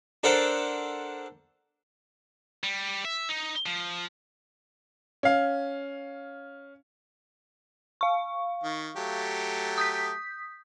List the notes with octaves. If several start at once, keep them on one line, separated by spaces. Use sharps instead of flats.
D4 A4 A#4 C5 F#5 A5
G3
E5
D#4
F3
C#4 F5
F5 C#6
D#3
F#3 A3 G4
D#6 G6 B6